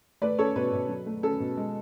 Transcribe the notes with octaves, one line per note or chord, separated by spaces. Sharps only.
A3 B4 D5
C#4 A4 C#5
B2 B4
B2
F#3
A3
C#4 A4
B2
G#3